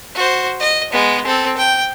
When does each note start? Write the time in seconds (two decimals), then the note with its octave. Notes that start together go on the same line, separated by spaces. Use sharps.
0.15 F#4 C5
0.60 D#5
0.92 G#3 B3
1.25 C4 A4
1.57 G5